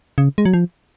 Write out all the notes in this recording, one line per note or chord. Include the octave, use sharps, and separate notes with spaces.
C#3
G#3
F#3
F3